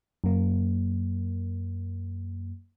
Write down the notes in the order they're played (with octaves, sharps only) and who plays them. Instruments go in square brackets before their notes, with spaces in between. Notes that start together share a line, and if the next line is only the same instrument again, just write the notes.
[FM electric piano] F#2 A#3